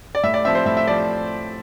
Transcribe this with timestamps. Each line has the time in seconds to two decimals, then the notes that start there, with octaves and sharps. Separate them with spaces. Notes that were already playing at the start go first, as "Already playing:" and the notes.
0.15 D5
0.23 A2 E5
0.34 D5
0.45 F3 C4 E5
0.55 C5
0.66 A2 E5
0.77 E5
0.87 F3 D5